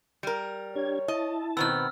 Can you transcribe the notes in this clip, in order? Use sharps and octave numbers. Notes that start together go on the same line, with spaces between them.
G3 A#4
D4 G4 C#5 G#6
E4 D#5 A5
B2 D#3 B3 C4 E6 F6